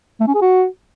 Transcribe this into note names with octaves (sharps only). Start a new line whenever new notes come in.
A3
C#4
G#4
F#4